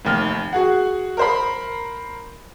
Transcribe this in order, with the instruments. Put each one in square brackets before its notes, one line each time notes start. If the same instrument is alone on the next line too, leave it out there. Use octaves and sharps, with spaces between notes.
[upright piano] F1 D#2 F6
F#4 G#4 F#5
A#4 C5 B5